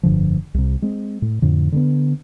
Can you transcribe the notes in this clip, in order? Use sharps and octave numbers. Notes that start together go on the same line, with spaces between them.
F1 G2 D3 F3
C2 C3
G#3 C4
A2
F2 A2 D3
D3 A3 B3